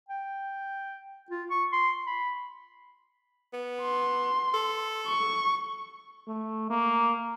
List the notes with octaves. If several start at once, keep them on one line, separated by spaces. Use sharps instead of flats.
G5
F4
C#6
C6
B5
B3
C6
A4
C#6
A3
A#3